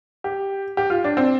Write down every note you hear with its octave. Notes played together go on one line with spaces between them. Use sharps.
G4
G4
F4
D4
C4